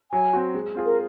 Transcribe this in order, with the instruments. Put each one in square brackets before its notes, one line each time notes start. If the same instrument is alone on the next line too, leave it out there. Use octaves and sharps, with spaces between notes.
[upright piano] F#3 [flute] G#5
[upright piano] C4 F#4
G#3
C4 F4 G#4
[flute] A#4